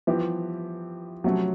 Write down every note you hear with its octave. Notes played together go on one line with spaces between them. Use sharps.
E3 F3 G3 B3 E4 G4
C3 F3 F#3 A3 C#4